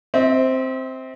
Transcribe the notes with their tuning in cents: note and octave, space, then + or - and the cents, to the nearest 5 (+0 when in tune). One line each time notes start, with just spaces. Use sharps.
C4 +0 E5 -40